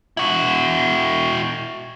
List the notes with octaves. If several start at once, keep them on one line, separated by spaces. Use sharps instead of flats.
E4 F#4